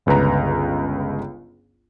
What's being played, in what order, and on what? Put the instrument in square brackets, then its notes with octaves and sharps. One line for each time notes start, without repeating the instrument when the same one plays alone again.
[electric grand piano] G1 C#2 B4 A#5